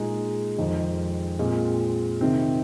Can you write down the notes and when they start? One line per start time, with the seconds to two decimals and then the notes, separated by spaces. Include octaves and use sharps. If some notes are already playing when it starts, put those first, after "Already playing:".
Already playing: A#2 G#3 D#4
0.58 F2 D#3 G#3 D#4
1.39 A#2 G#3 C4 F4
2.21 C3 D#3 C4